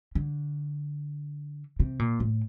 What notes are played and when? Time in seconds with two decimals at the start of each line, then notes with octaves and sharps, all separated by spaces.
0.15 D3
1.80 C3
1.99 A#2
2.20 A2